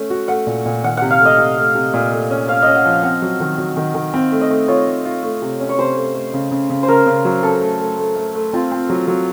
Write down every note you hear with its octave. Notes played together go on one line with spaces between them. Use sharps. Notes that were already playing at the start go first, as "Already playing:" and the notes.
Already playing: A3 C#4
F#4
A3 F#5
A#2
A#2
D#3 F#5
C3 F#5
F5
A3
D#5
C3
A3
C3
A#2
A3
C#4
C#4 F5
C#4 D#5
F#5
F3 F5
C4 F#5
F#3
D#3
F#3
D#3
D#3
C4 F5
A3
D#5
A3
F4 C#5
A3
F4
A3
C3
C#4
C#5
C3 C5
A3
A3
C#3
C#3
C#3
C5
C#3 A#4
C#3
F#3
C#4 A4
A3
A3
A3
A3
A3
C4 F4
C4
F#3
F#3